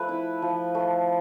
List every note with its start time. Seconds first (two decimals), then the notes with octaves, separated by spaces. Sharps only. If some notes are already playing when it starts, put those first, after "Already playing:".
Already playing: F3 A3 B4 E5
0.09 E4
0.42 F3
0.75 A3